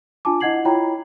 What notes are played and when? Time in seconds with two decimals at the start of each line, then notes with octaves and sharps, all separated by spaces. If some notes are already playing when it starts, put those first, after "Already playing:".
0.25 D4 F4 G#5 A5 D6
0.41 E4 D#5 F#5 G#6 C7 F#7
0.65 E4 F4 C#5 G5 A#5 B5